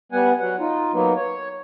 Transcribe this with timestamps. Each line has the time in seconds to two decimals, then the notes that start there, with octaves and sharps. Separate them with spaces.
0.12 G3 B3 F#5 G#5
0.39 F#3 F#5
0.60 D#4 F4
0.93 F#3 A#3 B3 D#4
1.16 C#5